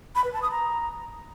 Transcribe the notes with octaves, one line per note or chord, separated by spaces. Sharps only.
B5
B4
A5
D#6
A#5